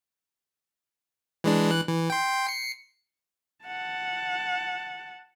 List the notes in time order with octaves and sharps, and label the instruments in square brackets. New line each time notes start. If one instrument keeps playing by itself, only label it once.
[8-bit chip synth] E3 G#3 D4
E3 F#6
E3
G5 C6
C7 C#7
[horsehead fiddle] F#5 A5